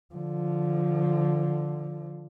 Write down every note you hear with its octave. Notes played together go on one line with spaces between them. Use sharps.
D3 F3